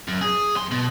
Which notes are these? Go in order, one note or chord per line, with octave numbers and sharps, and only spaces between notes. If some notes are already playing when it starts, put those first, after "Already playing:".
F#2
G#4
F#2 C6
B2